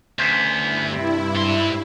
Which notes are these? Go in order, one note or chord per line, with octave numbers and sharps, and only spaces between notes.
D2 B3 C#4 C5
G2 E4
C3
G#2 C6